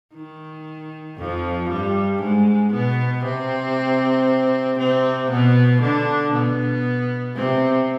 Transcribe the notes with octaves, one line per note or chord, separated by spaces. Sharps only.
D#3
F2 F3
G2 G3
G#2 G#3
B2 B3
C3 C4
C3 C4
B2 B3
D3 D4
B2 B3
C3 C4